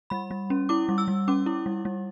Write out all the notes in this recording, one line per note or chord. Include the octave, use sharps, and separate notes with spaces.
G3 B5
G3
C#4
E4 D6
G3
E6
G3
C#4 D6
E4
G3
G3